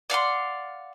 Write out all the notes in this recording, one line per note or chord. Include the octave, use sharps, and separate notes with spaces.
D5 F5 F#5 C6